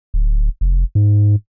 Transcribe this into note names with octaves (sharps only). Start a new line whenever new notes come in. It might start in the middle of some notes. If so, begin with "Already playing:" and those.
D1
F1
G#2